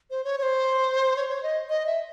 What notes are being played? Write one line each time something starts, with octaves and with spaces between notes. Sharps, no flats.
C5
C#5
C#5
C5
C#5
C#5
D#5
D#5
E5